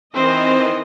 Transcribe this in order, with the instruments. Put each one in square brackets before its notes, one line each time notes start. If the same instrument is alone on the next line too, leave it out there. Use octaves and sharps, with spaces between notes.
[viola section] D#3 E3 D#5 [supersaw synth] C4 [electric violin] C5